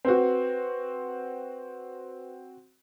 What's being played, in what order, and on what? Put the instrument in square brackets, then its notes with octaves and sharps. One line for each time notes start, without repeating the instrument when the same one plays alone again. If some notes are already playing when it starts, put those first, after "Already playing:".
[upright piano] C4 F#4 [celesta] B4